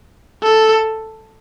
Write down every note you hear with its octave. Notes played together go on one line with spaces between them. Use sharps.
A4